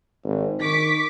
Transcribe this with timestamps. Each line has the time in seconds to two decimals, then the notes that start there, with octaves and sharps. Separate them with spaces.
0.24 G#1
0.60 D#3 C#6 D6 B6